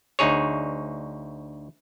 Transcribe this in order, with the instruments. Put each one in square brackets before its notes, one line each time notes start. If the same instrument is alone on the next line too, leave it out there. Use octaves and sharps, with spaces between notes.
[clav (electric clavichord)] D2 D#4 G#4 C#5